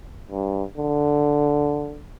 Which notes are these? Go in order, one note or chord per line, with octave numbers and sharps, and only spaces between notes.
G2
D3